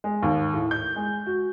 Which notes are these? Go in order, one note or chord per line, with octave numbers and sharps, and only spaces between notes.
G#3
D#2
A2
G6
G#3
F#4